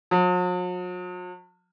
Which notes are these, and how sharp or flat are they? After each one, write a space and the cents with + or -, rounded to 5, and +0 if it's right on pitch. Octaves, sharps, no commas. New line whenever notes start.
F#3 -45